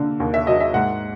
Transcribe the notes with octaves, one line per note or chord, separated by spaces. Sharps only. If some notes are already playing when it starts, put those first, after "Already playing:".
Already playing: D3 A#3
D#2
E5
F#3 D#5
E5
G#2 F#5